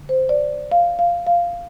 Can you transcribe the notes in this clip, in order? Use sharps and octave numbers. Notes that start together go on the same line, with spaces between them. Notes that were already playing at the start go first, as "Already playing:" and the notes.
Already playing: D3
C5
D5
F5
F5
F5